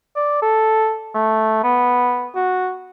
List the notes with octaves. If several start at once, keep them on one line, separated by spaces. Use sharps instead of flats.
D5
A4
A3
B3
F#4